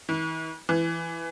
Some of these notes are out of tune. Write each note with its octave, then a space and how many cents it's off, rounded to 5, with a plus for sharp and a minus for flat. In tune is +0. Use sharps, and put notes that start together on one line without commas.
E3 -45
E3 +10